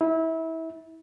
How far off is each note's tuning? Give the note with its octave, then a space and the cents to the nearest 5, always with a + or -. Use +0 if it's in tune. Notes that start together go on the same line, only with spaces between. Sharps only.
E4 -25